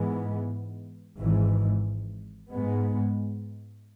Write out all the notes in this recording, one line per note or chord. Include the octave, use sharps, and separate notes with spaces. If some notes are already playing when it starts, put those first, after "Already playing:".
Already playing: G#2 E3 G#3 B3
G#1 G#2 E3
G#2 G#3 B3